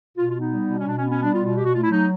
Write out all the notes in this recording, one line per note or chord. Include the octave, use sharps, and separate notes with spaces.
B2 F4
F4
B3
D#4
G3
B2
C#4
B2 D4
C#4
B3
C#4
G3 D4
F4
B2
F4
A#2 G4
F#4
A3 F4
E4
F#3 D#4